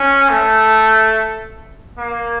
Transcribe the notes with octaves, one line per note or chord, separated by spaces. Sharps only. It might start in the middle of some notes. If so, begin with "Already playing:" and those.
Already playing: C#4
A3
A#3